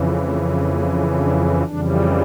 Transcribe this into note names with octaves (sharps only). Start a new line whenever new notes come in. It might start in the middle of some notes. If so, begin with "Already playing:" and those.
Already playing: F2 C#3 E3
A3
A#3
D4
F2 C#3 E3 G3 D4